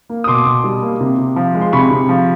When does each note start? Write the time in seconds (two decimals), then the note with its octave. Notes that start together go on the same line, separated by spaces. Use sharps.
0.09 A#3
0.24 D#6
0.28 B2 C6 D6
0.46 B2
0.64 G3
0.82 A#3
1.01 C3
1.18 C3
1.36 F3
1.55 G#3
1.62 C6
1.73 C3 B5 C#6
1.91 C3
2.09 F3